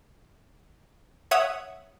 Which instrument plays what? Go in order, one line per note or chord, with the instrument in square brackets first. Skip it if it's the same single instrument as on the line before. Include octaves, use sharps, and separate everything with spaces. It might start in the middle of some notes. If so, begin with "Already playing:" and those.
[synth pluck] C#5 E5 F#5 D#6